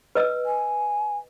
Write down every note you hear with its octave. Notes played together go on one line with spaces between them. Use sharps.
B4 D#5 E6
G#5